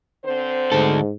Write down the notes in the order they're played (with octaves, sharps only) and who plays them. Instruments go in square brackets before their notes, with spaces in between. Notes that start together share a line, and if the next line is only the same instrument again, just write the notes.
[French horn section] D3 C4 C5
[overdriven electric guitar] D2 A4 [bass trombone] G#2